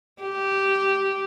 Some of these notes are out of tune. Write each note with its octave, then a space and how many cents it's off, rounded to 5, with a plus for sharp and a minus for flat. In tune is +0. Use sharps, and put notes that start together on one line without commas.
G4 -10